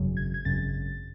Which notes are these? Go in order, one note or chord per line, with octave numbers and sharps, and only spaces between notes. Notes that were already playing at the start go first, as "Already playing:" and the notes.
Already playing: G#1 F#2 C#3 F#3
G#6
G#6
G#1 F#2 C#3 F#3 A6